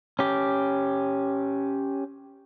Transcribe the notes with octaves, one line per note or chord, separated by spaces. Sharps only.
C#4 G4